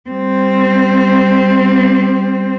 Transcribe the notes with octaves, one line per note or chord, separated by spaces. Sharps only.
G3 C4